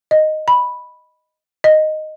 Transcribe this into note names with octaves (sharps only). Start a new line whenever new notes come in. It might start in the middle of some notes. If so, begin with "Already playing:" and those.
D#5
B5
D#5